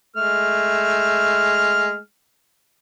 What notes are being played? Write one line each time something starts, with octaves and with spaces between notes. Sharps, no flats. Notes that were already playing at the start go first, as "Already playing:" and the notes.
G#3 A3 F6